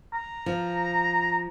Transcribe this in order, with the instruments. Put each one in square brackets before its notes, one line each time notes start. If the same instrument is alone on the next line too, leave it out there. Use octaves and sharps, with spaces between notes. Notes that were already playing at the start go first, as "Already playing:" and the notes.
[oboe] A#5
[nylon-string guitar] F3